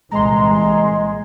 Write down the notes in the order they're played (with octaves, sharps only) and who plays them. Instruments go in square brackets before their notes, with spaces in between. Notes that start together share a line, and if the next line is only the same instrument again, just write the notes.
[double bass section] C2 A#2 E3 [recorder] G#3 [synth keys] A#5 C6